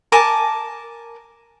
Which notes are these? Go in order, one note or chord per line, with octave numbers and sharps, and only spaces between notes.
A#4 G#5 A5 D6